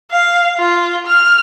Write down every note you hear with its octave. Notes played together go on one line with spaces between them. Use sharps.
F5
F4
F6